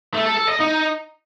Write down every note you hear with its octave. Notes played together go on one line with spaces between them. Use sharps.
A3
A4
A4
D#5
D#4